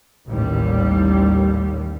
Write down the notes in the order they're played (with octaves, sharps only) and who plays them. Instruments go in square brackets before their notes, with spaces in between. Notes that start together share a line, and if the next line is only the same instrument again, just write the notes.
[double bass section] A1 D#2 G3